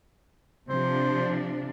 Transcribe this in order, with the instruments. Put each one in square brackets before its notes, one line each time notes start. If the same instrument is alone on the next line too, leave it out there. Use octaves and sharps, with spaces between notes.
[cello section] C3 F3 D4 [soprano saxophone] C5